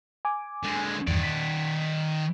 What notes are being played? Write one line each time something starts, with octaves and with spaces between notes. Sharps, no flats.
G#5 D6
D3 G#3
E2 G2 D#3 D5
B6